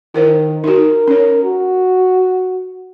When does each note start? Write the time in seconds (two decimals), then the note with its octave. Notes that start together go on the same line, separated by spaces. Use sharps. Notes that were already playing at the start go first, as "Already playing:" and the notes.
0.14 D#3 E4 A#4 C5
0.64 D#4 F#4 A#4
1.08 C#4 C#5
1.43 F#4